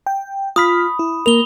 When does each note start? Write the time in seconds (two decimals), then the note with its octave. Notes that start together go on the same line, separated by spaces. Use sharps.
0.07 G5
0.56 F4 B5 D#6 F6 B6
0.99 E4
1.26 A#3 A#4 F7 G7